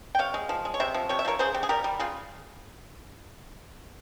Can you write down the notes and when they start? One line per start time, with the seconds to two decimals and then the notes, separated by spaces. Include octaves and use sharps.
0.15 G5
0.19 C3 C#5 F5
0.34 G#3
0.49 F3
0.65 G#3
0.74 C#5
0.80 C3 C5 E5
0.94 F3
1.09 C3 C#5
1.19 E5
1.25 F3 A#4 C#5
1.39 C#3 G#4 C5
1.54 C#3 G4
1.63 G#4
1.69 G3 G4 A#4
1.84 G3
1.99 C#3 F4 G#4